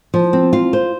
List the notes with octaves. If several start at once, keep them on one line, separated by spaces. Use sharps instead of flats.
F3
C4
F4
C5